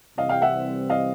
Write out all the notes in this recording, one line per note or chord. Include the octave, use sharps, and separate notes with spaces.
C2 C3 E3 G3 C4 D#5 F5
F5 G5
E5 F#5
D#5 F5